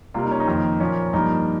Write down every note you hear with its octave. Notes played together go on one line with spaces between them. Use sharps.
C3 G3 A#3 F4
D#4
C#4
D#4
F2 D#3 A#3
A#2 F3 A#3 C#4
G2 F3 A#3 D#4